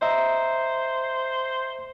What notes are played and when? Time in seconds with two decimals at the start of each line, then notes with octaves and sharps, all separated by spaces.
0.02 C5 D#5 E5 A#5